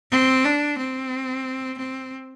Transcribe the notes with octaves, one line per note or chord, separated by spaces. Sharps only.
C4
D4
C4
C4